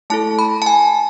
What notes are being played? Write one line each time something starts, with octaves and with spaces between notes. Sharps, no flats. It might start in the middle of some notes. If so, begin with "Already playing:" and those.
A3 E4 A4 A5
B5
A5
G#5